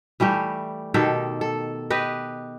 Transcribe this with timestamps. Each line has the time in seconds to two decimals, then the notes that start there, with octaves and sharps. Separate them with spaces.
0.20 E3 G3 A3 G4
0.94 B2 D#3 G4 A4
1.41 A4
1.90 G4 B4 D#5